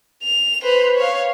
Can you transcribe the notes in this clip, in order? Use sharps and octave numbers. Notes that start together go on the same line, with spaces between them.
F7
B4 C5
C#5 F5